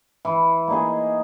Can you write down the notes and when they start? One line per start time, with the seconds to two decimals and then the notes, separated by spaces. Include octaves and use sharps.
0.25 E3
0.68 A#3 D#4 G#4